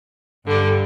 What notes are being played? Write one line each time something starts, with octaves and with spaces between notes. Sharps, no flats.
G2 D3 G3